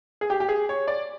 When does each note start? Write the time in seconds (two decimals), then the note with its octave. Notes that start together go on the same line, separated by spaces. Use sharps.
0.21 G#4
0.30 G4
0.40 G4
0.49 G#4
0.69 C#5
0.88 D5